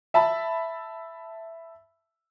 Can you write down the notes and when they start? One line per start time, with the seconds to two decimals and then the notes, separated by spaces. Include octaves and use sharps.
0.14 E5 A5 B5